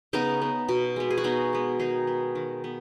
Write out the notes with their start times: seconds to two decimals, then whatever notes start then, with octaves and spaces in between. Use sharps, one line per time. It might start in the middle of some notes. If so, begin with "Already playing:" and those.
0.13 C#3 B3 D#4
0.42 B3
0.69 B2
0.96 G#3 B3
1.11 G#4
1.18 F#4
1.24 B2 B3 D#4
1.53 G#3 B3
1.79 D#3 D#4 G#4
2.07 B3
2.35 D#3
2.64 B3